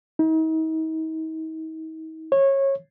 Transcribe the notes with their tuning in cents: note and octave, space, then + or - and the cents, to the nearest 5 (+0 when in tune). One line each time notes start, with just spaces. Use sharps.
D#4 +40
C#5 -20